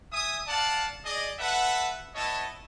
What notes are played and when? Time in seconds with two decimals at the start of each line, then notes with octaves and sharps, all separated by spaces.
0.13 E5 G#5 D#6
0.47 D5 F5 F#5 A5
1.04 G#4 D5 D#5
1.39 A4 B4 E5 F#5
2.15 B3 E4 C#5 D#5 A5